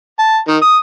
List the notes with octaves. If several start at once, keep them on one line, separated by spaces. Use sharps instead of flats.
A5
D#3
D#6